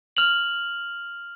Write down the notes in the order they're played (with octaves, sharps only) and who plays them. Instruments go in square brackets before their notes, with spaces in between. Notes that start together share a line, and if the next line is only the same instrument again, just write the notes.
[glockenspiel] F6 F7 F#7